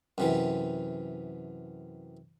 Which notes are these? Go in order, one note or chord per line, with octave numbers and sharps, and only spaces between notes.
F#2 C3 E3